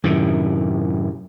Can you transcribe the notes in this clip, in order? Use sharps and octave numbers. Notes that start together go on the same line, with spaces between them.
F#2 A2 C3 D#3